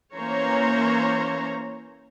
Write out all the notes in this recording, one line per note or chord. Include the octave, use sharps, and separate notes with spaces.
E3 A#3 C#4 C5 C#5 A#5